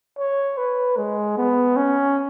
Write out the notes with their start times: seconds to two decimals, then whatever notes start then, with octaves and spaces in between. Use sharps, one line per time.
0.18 C#5
0.57 B4
0.97 G#3
1.37 B3
1.76 C#4